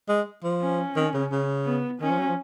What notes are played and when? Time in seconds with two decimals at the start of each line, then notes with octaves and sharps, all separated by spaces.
0.09 G#3
0.44 F3
0.62 C#4
0.96 D#3
1.14 C#3
1.32 C#3
1.66 B3
2.01 D#3 C#4
2.10 F3
2.18 F#3
2.28 F3